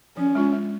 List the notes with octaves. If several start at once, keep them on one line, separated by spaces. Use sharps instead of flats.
F3 C#4
G#3 D4 F4
G#3